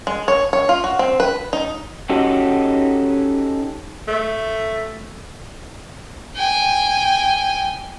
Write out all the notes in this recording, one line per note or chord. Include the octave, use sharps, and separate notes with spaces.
G#3
C#5
C#5
F4
F#4
C4
B4
D#4
C#4 D#4 F#4 G4 A4
A3
G5 G#5